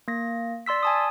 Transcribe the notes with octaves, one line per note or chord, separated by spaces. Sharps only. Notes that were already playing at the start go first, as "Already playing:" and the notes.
A#3 A#6
D5 C6 E6 B6
G#5 A5 D#6